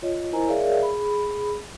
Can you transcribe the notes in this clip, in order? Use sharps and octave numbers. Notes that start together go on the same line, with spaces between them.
F4 C#5 D#5
E4 A#4 C5 D#5 G#5 A#5
G#4 A#4 C#5 D5 E5 F5
G#4 B5